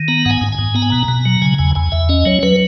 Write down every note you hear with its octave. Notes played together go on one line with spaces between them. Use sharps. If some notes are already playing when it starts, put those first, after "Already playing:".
Already playing: D#3
B3 A#5
G#2 F#5 G#5
G#2
G#5
G#2
B3 A#5
G#5
B2 A#5
B2
F#3
C#3 G#5
E2 G#5
E2 G#5
E2 E5
C#4 D#5
F#3 C#5
F#3 B4